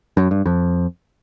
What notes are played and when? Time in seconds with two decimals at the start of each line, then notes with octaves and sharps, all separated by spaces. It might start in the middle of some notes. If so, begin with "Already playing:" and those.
0.17 F#2
0.31 G2
0.46 F2